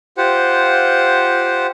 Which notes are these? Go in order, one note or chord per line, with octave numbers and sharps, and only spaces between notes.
F4 G4 C5 F#5